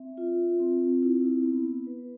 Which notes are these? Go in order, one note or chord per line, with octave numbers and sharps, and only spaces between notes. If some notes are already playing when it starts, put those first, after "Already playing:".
Already playing: C4 E5
F4
C4
E4
B3
B4